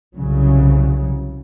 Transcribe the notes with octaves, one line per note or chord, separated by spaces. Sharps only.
C2 C#3 F#3